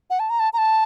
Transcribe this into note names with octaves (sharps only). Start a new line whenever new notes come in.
F#5
A5
A#5
A5
A#5
A5